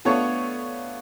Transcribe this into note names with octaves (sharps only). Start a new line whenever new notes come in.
A3 B3 D4 F4 C#5 A5